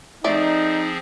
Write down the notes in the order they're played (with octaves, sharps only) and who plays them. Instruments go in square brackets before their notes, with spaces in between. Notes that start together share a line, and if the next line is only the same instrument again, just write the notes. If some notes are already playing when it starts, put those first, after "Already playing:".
[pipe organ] F3 C4 G#4 [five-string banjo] A3 D5 [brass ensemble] D#4